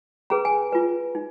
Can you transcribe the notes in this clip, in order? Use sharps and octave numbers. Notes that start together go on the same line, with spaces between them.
C#4 G#4 B4 A#5
G#5
F4 B4
D#4